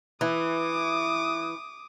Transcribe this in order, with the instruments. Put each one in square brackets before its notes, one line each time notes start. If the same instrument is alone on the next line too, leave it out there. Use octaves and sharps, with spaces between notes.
[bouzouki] E3 [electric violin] D6 D#6